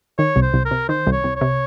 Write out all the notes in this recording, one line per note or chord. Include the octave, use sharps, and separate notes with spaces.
D#3 C#5
C2
C5
C2
A#4
C3
D#3 C5
C2
C#5
C2
C#5
C3